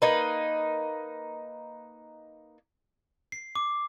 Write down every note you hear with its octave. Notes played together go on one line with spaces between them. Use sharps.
A#3 D#4 B4
C7
D6